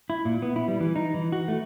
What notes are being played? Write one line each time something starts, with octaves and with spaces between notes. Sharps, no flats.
E4
A#2
B3
E4
G3
E3
D#4
E3
F#4
A3